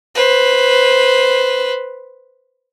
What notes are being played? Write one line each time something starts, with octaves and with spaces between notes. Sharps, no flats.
B4 C5